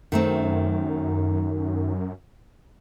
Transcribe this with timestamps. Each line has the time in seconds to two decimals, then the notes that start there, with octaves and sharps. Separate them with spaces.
0.12 F#2 D#3 A3 C4